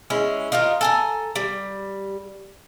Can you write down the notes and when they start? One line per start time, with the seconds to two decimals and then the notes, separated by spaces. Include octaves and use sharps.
0.10 G#3 C#4 E4
0.52 D#4 F4 G4 A#4
0.81 A4 G#5 A#5
1.36 G3